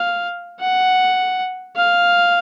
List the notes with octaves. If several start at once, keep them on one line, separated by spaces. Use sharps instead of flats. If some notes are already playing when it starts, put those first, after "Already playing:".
Already playing: F5
F#5
F5